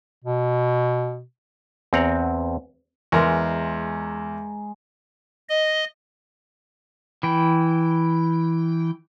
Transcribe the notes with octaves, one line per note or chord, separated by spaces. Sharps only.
B2
E2 C4 F#5 A#5
E2 G#3 A#4 A#5
D#5
E3 G5